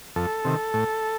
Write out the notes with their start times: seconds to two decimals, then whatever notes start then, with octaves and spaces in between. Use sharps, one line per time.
0.16 F2 A4
0.45 C3 D#3
0.74 A2